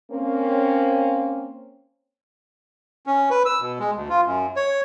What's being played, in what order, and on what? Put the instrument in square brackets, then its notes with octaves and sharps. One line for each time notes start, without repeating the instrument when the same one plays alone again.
[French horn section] A#3 C4 C#4
[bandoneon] C#4
B4
E6
B2
G#3
D2
F4
F#2
C#5